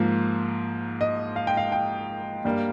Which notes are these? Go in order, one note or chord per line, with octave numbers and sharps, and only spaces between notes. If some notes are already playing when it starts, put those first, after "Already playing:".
Already playing: G#2 F3 A#3
D#5
F5
G5
F5
G5
G2 G3 A#3